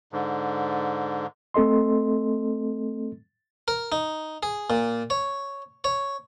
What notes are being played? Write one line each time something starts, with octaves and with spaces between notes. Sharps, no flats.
G#2 D3
A3 C4 A4 D#5 C6
A#4
D#4
G#4
A#2
C#5
C#5